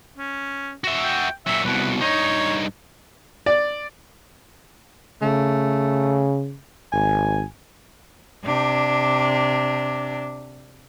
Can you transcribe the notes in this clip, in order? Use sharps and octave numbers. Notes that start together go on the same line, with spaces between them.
C#4
F#4 E5
G5
A#2 F#3 E5
C2 B2 B4
G2 D#4 C#5
D5
C#3 A3
G#1 G#5
C3 D4